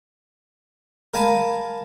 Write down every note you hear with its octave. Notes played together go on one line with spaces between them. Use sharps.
A#4 F5 G#5 A5 B5